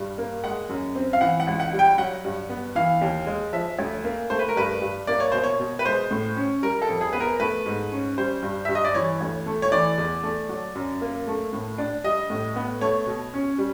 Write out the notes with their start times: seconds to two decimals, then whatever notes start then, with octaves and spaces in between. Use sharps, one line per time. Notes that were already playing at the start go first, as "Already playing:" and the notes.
Already playing: G2 G3
0.18 A#3
0.44 G#3 F#5
0.69 F#2
0.95 C4
1.13 F5
1.21 E3 F#5
1.40 F#5
1.47 C#2
1.60 F#5
1.73 G3
1.79 G5
1.98 F#3 F#5
2.25 G2
2.49 B3
2.75 E3 F5
3.01 D#2
3.27 G#3
3.53 F3 E5
3.79 D2
4.04 A#3
4.30 A3 C5
4.39 B4
4.49 A#4
4.56 G2 B4
4.81 G2
5.07 A#3 D5
5.20 C#5
5.32 B2 C5
5.44 C#5
5.59 B2
5.79 B4
5.85 G#3 C5
6.11 A2
6.36 C#4
6.62 G3 A#4
6.82 A4
6.89 F2
7.01 G#4
7.13 B3 B4
7.20 A#4
7.40 A3 B4
7.66 G#2
7.92 C#4
8.18 G3 C5
8.42 G2
8.65 G2 E5
8.75 D#5
8.85 D5
8.95 E3 C#5
9.21 D2
9.46 A3
9.62 C#5
9.71 E3 D5
9.98 E2
10.23 A3
10.49 F#3
10.75 F#2
11.01 A#3
11.27 A3
11.53 A2
11.78 D4
12.04 G3 D#5
12.30 A2
12.56 B3
12.81 A3 C#5
13.07 B2
13.34 C#4
13.58 G3